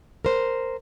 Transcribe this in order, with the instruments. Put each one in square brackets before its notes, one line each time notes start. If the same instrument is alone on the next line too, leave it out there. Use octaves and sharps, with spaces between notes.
[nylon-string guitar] A#4 C5